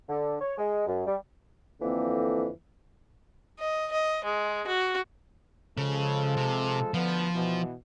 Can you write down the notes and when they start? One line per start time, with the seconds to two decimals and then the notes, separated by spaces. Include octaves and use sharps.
0.08 D3
0.41 C#5
0.57 G#3
0.86 F#2
1.05 G3
1.81 F2 D3 E3 A#3 C4
3.59 D#5
3.92 D#5
4.25 G#3
4.67 F#4
5.78 C#3 F3 G#3 A4
6.36 C3
6.94 D2 D3 F3 B3
7.35 B2 E3